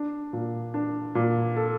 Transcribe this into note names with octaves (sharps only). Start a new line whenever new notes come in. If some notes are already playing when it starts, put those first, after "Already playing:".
Already playing: D4
A#2
D4
A#2
A4